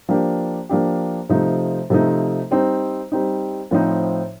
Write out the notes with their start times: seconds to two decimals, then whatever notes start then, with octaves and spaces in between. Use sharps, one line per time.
0.09 F3 A#3 D4 G4
0.69 F3 A#3 D4 G4
1.29 C3 F3 A3 D#4
1.90 C3 F3 A3 D#4
2.51 G3 C4 D#4
3.12 G3 C4 D#4
3.71 A2 F3 C4 D#4